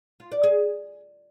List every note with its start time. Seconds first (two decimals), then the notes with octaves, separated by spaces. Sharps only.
0.20 F4
0.32 D5
0.43 G#4